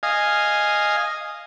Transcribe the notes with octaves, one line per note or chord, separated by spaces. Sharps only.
D#5 F5 G#5